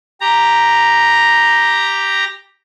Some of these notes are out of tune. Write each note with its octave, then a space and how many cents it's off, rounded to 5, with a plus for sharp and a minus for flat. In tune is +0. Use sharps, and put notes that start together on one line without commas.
G4 +0 A#5 +0